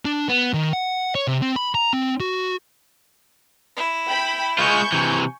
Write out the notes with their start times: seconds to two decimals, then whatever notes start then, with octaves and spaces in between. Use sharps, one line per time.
0.05 D4
0.29 B3
0.54 D#3
0.73 F#5
1.15 C#5
1.27 C3
1.42 C4
1.56 B5
1.75 A#5
1.93 C4
2.20 F#4
3.76 E4
4.08 G5 B5
4.59 G#3 F4 G#5 C#6 G6
4.92 C3 E3